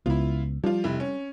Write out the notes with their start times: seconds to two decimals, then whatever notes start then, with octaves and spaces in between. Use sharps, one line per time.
0.06 C#2 B3 E4 F4
0.64 F3 G3 F4
0.84 F1 E4
1.00 C#4